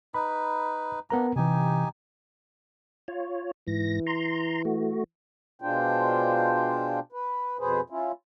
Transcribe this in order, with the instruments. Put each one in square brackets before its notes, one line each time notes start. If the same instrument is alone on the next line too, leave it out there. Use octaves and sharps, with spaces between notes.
[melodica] D#4 B4 [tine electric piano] B5
[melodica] A#3 D4 [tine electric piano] B3 A#4 A#5
[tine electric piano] C3 E3 [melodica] D#4 G4 G#5
[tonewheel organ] F4 C#5
[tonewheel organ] G#2 A#6 [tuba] E3
[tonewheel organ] A#5 C6
A3 F#4
[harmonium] B2 G#3 D4 F4 C5 G5
B4
F2 B2 G#4 B4 C5
C#4 E4 F4